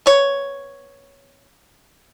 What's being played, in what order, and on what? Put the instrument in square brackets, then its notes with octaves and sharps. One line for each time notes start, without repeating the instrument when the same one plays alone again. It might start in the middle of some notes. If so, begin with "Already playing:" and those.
[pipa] B3 C#5